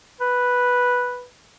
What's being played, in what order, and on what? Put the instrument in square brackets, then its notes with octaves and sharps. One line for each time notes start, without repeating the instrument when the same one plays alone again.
[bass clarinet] B4